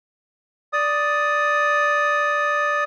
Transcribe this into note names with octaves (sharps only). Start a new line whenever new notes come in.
D5 D#6